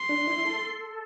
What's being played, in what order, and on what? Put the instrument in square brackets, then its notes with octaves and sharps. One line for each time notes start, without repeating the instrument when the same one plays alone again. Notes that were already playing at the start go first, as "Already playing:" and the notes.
Already playing: [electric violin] C6
[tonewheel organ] D4
E4
A4